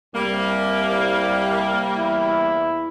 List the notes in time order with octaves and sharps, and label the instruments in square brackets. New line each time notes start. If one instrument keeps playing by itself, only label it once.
[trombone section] C2 [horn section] G3 A#3
[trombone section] E2 E4